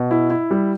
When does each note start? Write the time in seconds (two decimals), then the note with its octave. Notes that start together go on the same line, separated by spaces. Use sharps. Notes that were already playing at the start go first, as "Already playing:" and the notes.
Already playing: B2
0.11 E4
0.30 E4
0.51 G3